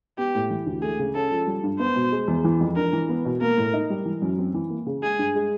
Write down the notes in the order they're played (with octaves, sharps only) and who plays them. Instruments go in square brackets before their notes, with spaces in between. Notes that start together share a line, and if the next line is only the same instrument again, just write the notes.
[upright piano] B3 [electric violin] G4
[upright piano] A2
E3
D2
[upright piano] A3 [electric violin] G#4
[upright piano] C#3
[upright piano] C#4 [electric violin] A4
[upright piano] F3
G3
G2
[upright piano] B3 [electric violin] C5
[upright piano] B2
G#3
E2
E3
F2
[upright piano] D4 [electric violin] A#4
[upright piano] E3
B3
B2
[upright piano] A#3 [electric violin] A#4
[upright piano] A2
D#4
G3
E3
F#2
C4
E3
A#3
C#3
[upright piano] G#3 [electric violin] G#4
[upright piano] G2
G#3